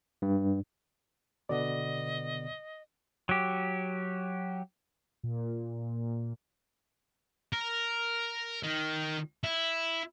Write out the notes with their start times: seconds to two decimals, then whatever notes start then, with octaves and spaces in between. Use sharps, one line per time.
0.22 G2
1.49 B2 D3 B3 D5 D#5
3.29 F#3 G4
5.23 A#2
7.53 A#4
8.63 D#3
9.44 E4